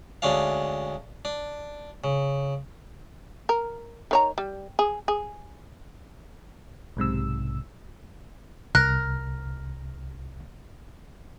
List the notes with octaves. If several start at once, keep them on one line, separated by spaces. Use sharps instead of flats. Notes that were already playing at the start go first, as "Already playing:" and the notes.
D2 G#3 C#4 D4 F5
D4
C#3
A#4
D#3 C#5 A#5
G3
G#4
G#4
B1 G#2 C3 E6
C2 A#4 F#6